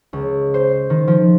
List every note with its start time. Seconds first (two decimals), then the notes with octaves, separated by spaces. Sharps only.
0.13 C#2
0.54 C5
0.90 D#3
1.08 F3